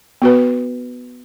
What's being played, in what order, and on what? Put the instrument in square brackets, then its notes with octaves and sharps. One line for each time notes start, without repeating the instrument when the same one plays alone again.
[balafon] B3 F#4 B4